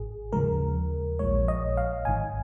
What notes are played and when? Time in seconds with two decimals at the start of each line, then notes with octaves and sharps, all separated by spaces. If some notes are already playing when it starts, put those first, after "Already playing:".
Already playing: G#1 G#2 G#4
0.33 D#2 C#3 F3 G#3 A#4
1.19 A#1 A#2 F3 G#3 C#5
1.48 D#5
1.77 F5
2.05 G#1 G#2 D#3 G#5